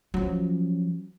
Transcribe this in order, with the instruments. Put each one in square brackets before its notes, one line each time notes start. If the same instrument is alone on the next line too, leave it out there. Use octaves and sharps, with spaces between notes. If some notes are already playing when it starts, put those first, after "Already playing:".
[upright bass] F3 C#4 [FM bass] F#3